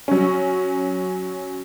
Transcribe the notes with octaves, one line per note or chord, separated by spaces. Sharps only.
F#3 C#4